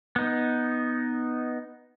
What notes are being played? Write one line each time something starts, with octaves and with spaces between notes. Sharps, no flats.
B3 D#4